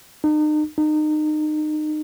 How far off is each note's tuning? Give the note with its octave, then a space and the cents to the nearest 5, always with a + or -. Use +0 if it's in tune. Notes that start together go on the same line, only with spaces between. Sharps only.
D#4 -40
D#4 -30